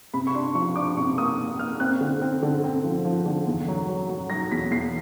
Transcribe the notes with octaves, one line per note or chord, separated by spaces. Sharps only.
C3 B5
C#6
D4 C6
F3 C#6
D4 D6
C3 C#6
A#3 D#6
A#3
A#3 F6
C4 F#6
D3
C4
D3
C4
F3
F3
D3
E2
F#3
F#3
F#3
F#3 A#6
E2 B6
E2 C7